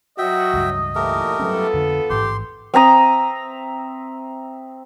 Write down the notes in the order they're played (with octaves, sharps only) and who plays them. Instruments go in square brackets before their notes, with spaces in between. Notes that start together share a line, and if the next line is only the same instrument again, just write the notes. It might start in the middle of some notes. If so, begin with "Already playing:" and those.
[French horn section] F#3 F#4 [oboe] D#5 [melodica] E5 G5
[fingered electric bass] C#2 G2
[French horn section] A#2 E3 [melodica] A3 G4 A#4
[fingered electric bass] F#3 G3 C#4 [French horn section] B3 F4 A4
[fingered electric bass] F2 D3 D4
[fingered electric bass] A1 G#2 [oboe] G4 [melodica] C6
[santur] C4 E5 A#5 D#6